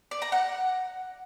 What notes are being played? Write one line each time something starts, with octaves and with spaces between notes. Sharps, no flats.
D5
A#5
F#5